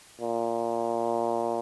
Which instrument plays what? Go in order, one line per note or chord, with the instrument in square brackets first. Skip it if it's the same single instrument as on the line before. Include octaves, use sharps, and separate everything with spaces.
[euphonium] A#2